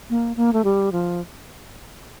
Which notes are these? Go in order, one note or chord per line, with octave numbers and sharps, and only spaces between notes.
A#3
A#3
A3
G3
F3